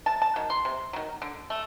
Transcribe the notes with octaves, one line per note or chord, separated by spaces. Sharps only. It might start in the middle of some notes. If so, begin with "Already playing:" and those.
C3 A5
A5
D#3 F#3
C6
C3
D#3 F#3
D3
A3